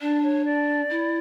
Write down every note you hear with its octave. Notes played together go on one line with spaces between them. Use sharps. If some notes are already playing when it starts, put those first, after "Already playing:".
D4 D5
C#5
D5
E4